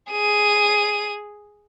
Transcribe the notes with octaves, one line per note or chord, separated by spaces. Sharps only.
G#4 D#7